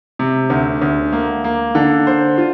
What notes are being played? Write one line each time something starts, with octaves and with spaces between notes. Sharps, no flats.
C3
D2
D2
A#3
A#3
D3
C5
F4